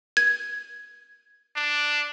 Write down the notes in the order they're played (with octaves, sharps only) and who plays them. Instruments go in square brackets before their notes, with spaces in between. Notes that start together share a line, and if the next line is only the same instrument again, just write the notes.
[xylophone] G#6
[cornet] D4